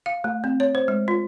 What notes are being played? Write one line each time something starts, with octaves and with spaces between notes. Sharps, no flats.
F5
A3
C4
C#5
C5
G#3
F4